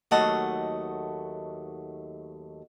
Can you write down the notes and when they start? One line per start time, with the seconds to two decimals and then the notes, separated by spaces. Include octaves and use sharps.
0.11 D#2 F#3 A3 D#5 F#5 A5